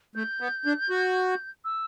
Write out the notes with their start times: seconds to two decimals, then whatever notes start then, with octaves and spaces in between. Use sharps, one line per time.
0.15 A3 G6
0.41 B3
0.66 D4
0.90 F#4
1.65 E6